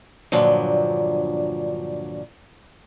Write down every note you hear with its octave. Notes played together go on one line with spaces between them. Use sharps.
G2 A#2 D3 F3 F#3